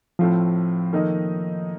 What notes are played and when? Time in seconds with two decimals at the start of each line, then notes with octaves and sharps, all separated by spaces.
0.19 A2 F3 A3 C4 F4
0.93 D#3 A#3 D#4 A4 D#5